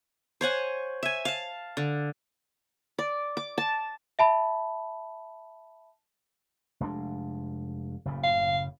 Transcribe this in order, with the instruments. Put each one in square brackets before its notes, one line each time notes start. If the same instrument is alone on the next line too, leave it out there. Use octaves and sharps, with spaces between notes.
[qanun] C5 C#5 F#5 G#5
E5 G#5
F5 A5
D3
D5
D6
A5
[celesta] E5 A5 B5
[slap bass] F1 G#3 D4
F#1 A2 C#3
[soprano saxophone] F5